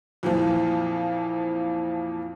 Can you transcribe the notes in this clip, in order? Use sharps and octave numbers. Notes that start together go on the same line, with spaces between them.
F2 A#2 E3 F3